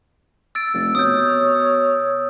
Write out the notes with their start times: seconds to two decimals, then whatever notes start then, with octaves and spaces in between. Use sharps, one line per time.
0.55 E6 A6 D7
0.74 F1
0.95 B2 C#5 D#6 G6